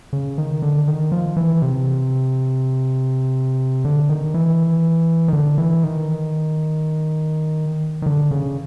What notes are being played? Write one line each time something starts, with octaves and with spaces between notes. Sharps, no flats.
C#3
D#3
D3
D#3
F3
E3
C3
D3
D#3
E3
D#3
D3
E3
D#3
D#3
D3
C#3